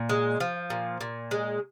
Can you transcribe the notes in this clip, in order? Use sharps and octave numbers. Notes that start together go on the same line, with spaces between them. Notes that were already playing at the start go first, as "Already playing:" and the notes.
Already playing: A#2
G#3
F3
A#2
A#2
G#3